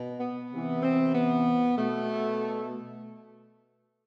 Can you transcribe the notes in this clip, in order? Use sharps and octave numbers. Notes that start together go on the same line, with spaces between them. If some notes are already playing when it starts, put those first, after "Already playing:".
Already playing: B2
B3
C3 E3
C4
B3
B2 A3